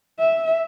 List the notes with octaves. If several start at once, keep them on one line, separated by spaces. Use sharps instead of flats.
E5